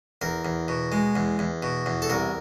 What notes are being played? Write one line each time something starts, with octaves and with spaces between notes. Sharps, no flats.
E2 A#4
E2
B2
G#3
E2
E2
B2
E2
A4
C2 A#4